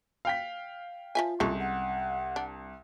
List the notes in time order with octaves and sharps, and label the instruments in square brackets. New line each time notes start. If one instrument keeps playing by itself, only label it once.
[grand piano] F5 G5 B6
[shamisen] F3 E5 G#5 [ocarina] F4
[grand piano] C2 [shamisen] C#3 G#3 A4
[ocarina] F#5
[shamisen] D4